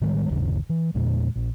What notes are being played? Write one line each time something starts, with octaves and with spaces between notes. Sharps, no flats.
A2 D#3 G3 G#3
G1 D#2 C#3 E3
E3
E2 A#2 D3 G#3
A#1